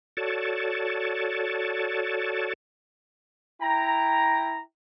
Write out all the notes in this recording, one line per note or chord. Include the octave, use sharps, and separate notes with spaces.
F#4 A4 C#5 D5 A5
E4 G5 A#5